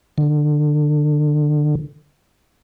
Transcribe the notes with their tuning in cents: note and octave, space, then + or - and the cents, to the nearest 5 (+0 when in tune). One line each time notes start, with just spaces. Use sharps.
D3 +25